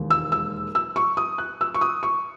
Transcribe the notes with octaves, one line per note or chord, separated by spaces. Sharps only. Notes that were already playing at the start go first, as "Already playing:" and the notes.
Already playing: E1 D#2 D#3 G#3
E6
E6
E6
C#6
D#6
F#6
E6
C#6
D#6
C#6